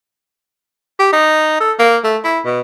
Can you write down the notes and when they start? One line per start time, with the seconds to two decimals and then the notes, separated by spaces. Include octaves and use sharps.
0.99 G4
1.13 D#4
1.60 A4
1.79 A#3
2.04 A3
2.24 E4
2.45 B2